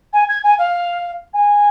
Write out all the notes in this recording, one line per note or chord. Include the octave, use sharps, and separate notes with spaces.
G#5
G#6
G#5
F5
G#5